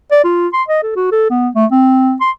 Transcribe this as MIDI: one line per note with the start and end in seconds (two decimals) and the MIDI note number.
0.11 0.23 74
0.24 0.48 65
0.54 0.63 84
0.69 0.81 75
0.83 0.96 69
0.96 1.12 66
1.12 1.26 69
1.31 1.49 59
1.55 1.66 57
1.72 2.15 60
2.21 2.31 84